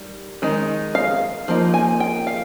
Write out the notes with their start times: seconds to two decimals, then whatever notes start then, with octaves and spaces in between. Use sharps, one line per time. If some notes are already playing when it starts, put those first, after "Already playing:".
Already playing: D#3 G3
0.42 D#3 G#3 D#4
0.95 F5
1.48 F3 A#3 D#4
1.74 G#5
2.00 G5
2.27 F5